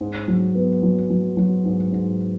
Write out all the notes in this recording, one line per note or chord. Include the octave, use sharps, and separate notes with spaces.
G#2
F#3
B3
F#3
F#3
F#3
G#2
G#2